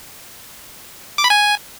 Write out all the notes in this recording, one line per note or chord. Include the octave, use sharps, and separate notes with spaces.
D6
B5
G#5